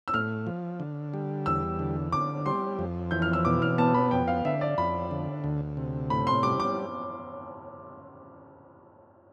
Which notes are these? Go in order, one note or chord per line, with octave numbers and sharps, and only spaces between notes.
E6
A2 F6
F3
D3
G3
E2 E6
D3
D3 D6
G3 C6
F2
E3 G6
F6
E6
B2 D6
F6
B3 A5
B5
F2 G5
F5
D3 E5
D5
F2 B5
D3
D2
C3
A2 B5
C6
G3 D6
D6